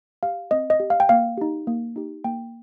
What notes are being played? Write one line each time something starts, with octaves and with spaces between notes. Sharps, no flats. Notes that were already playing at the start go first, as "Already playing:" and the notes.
G4 F5
C4 D#5
D#5
G4
F5
G5
A#3 F5
D#4 G4
A#3
D#4 G4
A#3 G5